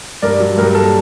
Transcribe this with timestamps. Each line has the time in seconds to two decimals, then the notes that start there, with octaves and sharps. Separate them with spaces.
0.22 G2 A#4 D5
0.40 F#3
0.58 G2 A#4
0.75 A#3 A4